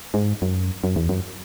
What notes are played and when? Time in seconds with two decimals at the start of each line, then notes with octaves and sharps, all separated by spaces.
0.14 G#2
0.42 F#2
0.84 F#2
0.96 E2
1.09 F#2